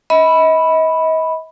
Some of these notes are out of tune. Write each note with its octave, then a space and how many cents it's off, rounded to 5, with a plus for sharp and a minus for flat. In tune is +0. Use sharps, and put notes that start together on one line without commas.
D#5 +40 B5 -5